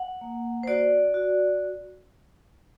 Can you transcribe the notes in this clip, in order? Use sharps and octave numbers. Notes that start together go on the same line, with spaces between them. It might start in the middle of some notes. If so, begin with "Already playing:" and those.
Already playing: F#5
A#3
C5
F#4 D5
F#4